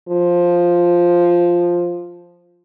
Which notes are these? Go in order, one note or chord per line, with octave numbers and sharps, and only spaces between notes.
F3